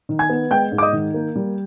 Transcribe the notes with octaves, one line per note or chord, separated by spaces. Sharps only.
D#3
G#5 G#6
B3
G#3 G5 G6
G#2
D6
D#5 D#6
D#3
A#3
G3